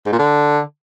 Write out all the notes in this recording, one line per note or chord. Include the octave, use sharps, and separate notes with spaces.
G#2
A#2
D3